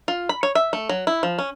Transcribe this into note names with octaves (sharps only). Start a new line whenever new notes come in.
F4
B5
C#5
E5
A3
F#3
E4
F3
C#4